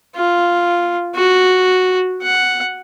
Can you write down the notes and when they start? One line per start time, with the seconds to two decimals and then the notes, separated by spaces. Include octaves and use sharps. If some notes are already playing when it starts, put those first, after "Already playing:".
0.16 F4
1.16 F#4
2.22 F#5